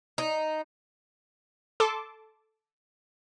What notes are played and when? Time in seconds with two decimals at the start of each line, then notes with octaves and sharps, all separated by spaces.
0.18 D#4
1.80 A4 A5 C6 D6